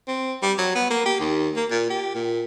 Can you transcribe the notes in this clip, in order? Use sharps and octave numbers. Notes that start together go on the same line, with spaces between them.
C4
G3
F#3
B3
A#3
G4
D#2
A#3
A#2
G4
A#2